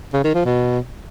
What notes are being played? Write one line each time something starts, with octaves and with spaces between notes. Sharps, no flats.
C#3
D#3
F3
B2